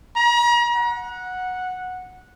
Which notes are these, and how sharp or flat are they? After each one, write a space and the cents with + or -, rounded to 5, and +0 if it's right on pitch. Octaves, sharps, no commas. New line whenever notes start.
A#5 +40
F#5 -10